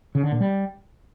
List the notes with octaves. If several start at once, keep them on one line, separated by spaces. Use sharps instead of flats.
C#3
D3
A#2
G3